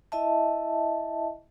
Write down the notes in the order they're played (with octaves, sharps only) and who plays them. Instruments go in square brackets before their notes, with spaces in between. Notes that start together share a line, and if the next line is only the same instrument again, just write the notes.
[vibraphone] E4 D#5 E5 A5